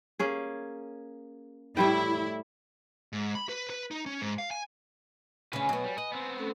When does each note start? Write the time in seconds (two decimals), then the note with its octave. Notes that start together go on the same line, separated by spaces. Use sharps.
0.19 A#3 C#4 G#4
1.77 A2 G3 E4 G5
3.13 G#2
3.35 B5
3.49 B4
3.70 B4
3.91 D#4
4.06 C#4
4.21 G#2
4.38 F5
4.51 G#5
5.53 D2 C#3 C#4 B4 G#5
5.69 B2 F#3 B3
5.84 G3
5.98 B4 D#5
6.12 B3 C4
6.37 A3 C#4 A4